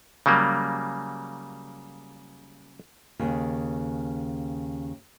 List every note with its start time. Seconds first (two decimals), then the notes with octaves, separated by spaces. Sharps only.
0.26 C#3 F#3 G3 A#3
3.19 D#2 C#3